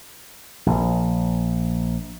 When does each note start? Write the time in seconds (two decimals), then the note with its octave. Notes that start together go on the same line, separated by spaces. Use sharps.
0.66 A#1